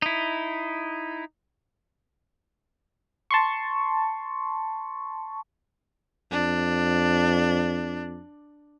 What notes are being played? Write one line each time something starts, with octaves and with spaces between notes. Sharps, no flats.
D#4 E4
A5 C6 C#6
F2 D4